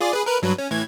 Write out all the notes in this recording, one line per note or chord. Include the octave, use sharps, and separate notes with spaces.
F4 G#4 D5
G#4 B4
A#4 B4
G2 F#3 B4
C#4
A2 E3 G#6